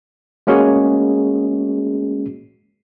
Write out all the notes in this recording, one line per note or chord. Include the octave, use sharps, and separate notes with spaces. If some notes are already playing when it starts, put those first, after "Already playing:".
G#3 A#3 C#4 F#4 G#4